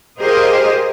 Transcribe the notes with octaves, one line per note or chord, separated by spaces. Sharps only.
F4 G4 G#4 A#4 C5 D#5